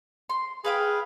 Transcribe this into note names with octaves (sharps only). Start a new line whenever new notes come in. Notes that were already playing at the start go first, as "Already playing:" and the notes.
C6
G#4 B4 F5 G5